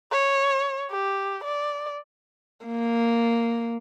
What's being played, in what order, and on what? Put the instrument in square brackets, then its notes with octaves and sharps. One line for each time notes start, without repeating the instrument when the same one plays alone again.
[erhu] C#5
G4
D5
[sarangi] A#3